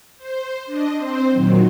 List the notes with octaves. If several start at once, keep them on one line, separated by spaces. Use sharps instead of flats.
C5
D4 D#5
C4 C5
A#2 D#3 F#3